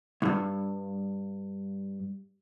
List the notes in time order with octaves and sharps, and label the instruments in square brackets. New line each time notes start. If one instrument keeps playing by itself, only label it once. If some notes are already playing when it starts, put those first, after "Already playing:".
[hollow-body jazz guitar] C2 G2